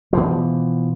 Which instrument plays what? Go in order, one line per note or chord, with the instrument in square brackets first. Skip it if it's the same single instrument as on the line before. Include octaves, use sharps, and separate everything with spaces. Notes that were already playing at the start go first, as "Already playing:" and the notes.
[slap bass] B2 E3 F3